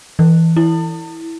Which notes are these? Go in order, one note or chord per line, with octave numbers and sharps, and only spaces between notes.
E3
E4